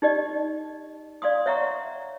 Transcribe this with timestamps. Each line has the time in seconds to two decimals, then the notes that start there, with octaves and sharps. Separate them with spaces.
0.02 D#4 G4 D5 D#5
1.22 D5 F5 C6 D#6
1.46 C#5 E5 F#5 A#5 C#6